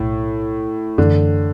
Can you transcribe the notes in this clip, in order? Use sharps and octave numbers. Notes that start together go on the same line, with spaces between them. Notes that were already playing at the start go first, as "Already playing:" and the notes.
Already playing: B1 A2
F#2 D3 E3 A3